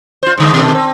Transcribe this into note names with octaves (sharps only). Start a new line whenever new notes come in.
F4 C5
G#2 D3 G#3
B2 D#3 A3
C4